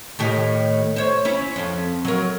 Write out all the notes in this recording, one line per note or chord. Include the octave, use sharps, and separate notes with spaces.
A2 D#3 G4
C5 C#5
C#4 E4
F2
F#3 A#4